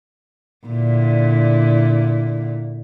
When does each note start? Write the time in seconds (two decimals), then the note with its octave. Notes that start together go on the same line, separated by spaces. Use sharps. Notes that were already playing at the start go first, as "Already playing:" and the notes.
0.67 A#2 D3 E4